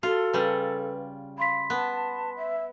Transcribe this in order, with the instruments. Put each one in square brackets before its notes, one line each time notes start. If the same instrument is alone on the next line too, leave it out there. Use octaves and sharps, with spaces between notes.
[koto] F4 [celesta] F#4 [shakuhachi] A4
[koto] C#3 G3 [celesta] B4
[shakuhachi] F5 [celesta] B5 C6 B6
[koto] B3 [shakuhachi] A5
[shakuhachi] E5